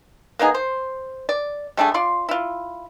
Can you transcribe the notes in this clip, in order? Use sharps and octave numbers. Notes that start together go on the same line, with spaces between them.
A#3 B3 D#4 G#4
C5
D5
G3 A3 D4 G#4
F4 D5 C6
E4 F4